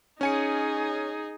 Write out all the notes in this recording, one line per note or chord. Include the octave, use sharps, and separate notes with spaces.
C#4 D#4 G#4 G#5 C#7